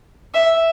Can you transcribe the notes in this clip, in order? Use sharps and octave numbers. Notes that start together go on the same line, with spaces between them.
E5